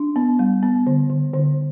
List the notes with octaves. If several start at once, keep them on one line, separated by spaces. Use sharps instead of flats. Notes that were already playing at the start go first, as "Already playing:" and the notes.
Already playing: D4
B3
G3
B3
D3
D3
D3